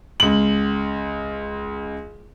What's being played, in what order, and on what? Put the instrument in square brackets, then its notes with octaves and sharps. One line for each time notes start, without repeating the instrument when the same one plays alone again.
[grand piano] C#2 F#7